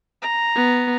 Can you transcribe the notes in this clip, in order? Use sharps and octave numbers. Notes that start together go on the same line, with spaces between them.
A#5
B3